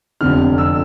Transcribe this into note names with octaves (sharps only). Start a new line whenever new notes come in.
F1 F2 D3 F6
E6